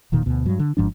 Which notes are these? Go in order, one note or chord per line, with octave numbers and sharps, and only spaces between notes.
E1 A#2 D#3
D2 B2
G2 F#3
D3
G#1 G#2 F3 D4